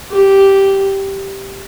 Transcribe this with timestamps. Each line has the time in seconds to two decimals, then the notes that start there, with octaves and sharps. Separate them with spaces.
0.11 G4